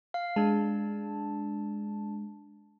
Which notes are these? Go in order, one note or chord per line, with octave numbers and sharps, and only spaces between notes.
F5
G#3 D4 A5